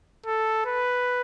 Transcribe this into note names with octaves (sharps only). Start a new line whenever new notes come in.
A4
B4